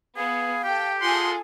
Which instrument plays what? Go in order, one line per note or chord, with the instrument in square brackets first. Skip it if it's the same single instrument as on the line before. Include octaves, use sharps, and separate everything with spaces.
[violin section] B3 [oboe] G#4 [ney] F5
[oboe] G4 [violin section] A4 G5
[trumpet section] G#3 F#5 C6 [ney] F4 [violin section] G#4 A4